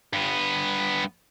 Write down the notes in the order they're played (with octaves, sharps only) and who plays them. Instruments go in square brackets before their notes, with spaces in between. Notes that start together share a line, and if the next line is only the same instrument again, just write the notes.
[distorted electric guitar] G2 B3